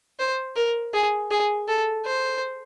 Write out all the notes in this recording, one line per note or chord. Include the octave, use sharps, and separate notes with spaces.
C5
A#4
G#4
G#4
A4
C5